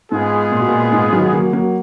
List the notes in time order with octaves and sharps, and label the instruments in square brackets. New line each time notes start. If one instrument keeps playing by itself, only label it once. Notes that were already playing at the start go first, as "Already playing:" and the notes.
[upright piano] G#2 [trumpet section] G#3 B3 F4 G#4
[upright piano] A#2
B2
A#2
G#2
D#3 F#3
F#3 A#3
F#3 A#3